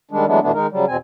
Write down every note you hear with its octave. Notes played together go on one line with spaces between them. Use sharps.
D#3 G3 G#3 D4
E3 F#3 G#3 A3 B3 D4
F#2 B2 E3 A3 B3 D4
D#3 G#3 D#4 A#4
C#3 F#3 G3
E2 B2 C4 G#5